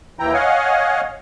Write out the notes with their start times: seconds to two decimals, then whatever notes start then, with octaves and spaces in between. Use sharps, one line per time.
0.19 D#2 E3 E4 G5 A#5
0.33 C#5 D#5 F5 F#5 G#5